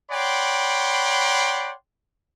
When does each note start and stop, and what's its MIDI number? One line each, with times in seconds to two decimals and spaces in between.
0.11 1.72 73
0.11 1.72 74
0.11 1.72 78
0.11 1.72 79
0.11 1.72 83
0.11 1.72 84